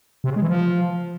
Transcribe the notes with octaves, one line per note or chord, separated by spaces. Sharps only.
C3
C#3
G#3
E3
F3